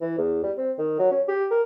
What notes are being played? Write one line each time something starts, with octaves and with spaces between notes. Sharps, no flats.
E3
E2
G3
C4
D#3
F#3
C#4
G4
A#4